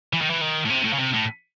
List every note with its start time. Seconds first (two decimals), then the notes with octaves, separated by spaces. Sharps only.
0.13 E3
0.22 D#3
0.30 E3
0.41 D#3
0.66 A2
0.70 C3
0.85 A2
0.94 C#3
1.00 C3
1.14 A2